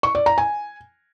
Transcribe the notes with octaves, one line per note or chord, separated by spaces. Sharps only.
C#6
D5
A#5
G#5